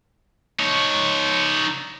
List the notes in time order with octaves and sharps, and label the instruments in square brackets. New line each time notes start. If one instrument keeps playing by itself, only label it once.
[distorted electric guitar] D#4 C#5